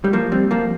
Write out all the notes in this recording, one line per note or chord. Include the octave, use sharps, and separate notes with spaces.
G3
F3 A#3
G3 C4
F3 A#3